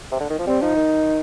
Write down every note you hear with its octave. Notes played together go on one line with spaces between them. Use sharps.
C3
D3
D#3
F3
G3 C4
F3 D#4
D#3